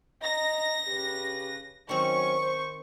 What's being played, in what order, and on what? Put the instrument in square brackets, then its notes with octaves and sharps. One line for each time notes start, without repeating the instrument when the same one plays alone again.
[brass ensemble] D#5 A#5 [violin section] A#6
[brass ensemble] C#3 G4 B4
[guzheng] D#3 C4 [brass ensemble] F#3 C#4 [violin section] C#6
[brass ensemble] C5